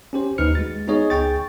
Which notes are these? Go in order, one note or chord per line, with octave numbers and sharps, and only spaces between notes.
C#4 G4 C5
D#2 D#4 B4 F6 C#7
G#3 F#4 A6
B3 D#4 G#4 C#5 D#5
C#2 G#4 G5 C#6 A6